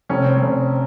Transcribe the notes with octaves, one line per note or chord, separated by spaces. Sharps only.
F1 C#4
C4
C#4
F1